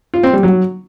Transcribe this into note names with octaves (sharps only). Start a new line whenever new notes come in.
F4
C4
G3
F#3